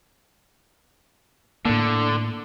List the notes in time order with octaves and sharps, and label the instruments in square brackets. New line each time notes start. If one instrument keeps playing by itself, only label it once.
[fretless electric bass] A2 A#3 [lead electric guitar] D3